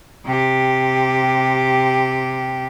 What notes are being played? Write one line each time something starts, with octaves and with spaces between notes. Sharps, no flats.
C3 G4